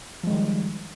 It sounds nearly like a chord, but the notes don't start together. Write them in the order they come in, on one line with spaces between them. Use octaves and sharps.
F3 G#3 D#3 G3